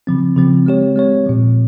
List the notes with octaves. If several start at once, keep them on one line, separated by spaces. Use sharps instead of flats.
C#3 F3 C4
C#3 F3 C4
G#3 C4 G4 C#5
G#3 C4 G4 C#5
A#2 F3 C4